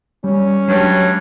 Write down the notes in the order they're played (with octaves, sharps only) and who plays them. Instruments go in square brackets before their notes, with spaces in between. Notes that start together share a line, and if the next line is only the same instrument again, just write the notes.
[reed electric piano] G3 [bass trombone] C#4
[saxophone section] G2 [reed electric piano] F#3 G#3 [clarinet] C#5